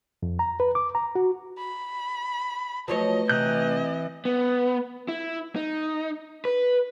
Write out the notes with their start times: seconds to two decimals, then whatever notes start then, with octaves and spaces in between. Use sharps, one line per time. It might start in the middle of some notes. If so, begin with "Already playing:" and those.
0.23 F2
0.39 A#5
0.60 B4
0.75 D6
0.95 A#5
1.15 F#4
1.58 B5
2.88 F3 F#3 A3 B4 C#5 D#5
3.29 C3 E3 D#5 F#6 G6
4.25 B3
5.08 E4
5.56 D#4
6.45 B4